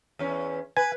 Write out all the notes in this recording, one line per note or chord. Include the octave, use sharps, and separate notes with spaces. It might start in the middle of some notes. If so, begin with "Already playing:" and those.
E2 C#4
B4 G#5